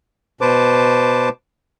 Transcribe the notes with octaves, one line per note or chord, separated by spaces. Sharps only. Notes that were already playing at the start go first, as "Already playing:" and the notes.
B2 B4 C5 A5 D6